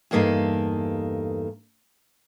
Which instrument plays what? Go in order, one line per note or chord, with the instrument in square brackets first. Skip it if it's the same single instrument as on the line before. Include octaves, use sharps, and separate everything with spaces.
[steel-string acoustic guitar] E2 G2 A#3 D#4 A4 F5